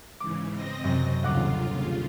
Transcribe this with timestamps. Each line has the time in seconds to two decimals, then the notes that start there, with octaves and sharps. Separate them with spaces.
0.20 G#2 C#3 E3 D6
0.53 C4 D#5 A#6
0.84 F#2 C3
1.23 G1 D#2 C#3 F4 F#5 D6